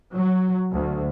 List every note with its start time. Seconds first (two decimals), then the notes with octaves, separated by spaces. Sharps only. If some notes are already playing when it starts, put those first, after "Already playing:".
0.13 F#3
0.72 D2